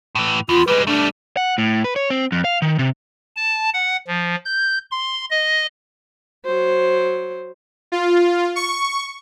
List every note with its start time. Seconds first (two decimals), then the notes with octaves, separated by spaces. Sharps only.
0.15 A2 E3
0.49 E2 F4
0.68 G3 G#3 B4
0.87 G3 A3 D4
1.37 F#5
1.58 A2
1.84 B4
1.96 C#5
2.10 C4
2.32 F2
2.44 F5
2.62 D#3
2.79 C3
3.36 A5
3.74 F#5
4.07 F3
4.45 G6
4.91 C6
5.30 D#5
6.45 F#3 C5
7.92 F4
8.56 C#6